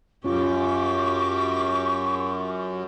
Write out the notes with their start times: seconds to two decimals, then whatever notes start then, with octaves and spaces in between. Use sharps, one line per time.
0.25 F#2 C#4 F4 G4 C#6 D6